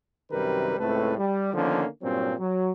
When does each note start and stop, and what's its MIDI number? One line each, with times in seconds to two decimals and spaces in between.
0.31 0.75 42
0.31 0.75 48
0.31 0.75 51
0.31 0.75 55
0.31 0.75 70
0.31 0.75 71
0.78 1.17 37
0.78 1.17 45
0.78 1.17 57
0.78 1.17 60
0.78 1.17 69
0.78 1.17 71
1.17 1.53 55
1.54 1.85 50
1.54 1.85 51
1.54 1.85 53
1.54 1.85 58
1.54 1.85 59
1.54 1.85 61
2.02 2.33 43
2.02 2.33 46
2.02 2.33 54
2.02 2.33 60
2.02 2.33 61
2.39 2.72 54